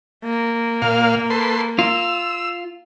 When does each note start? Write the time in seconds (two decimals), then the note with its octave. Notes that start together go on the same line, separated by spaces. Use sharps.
0.24 A#3
0.82 A#2 F5
1.30 A4 B4 C6
1.79 F4 E6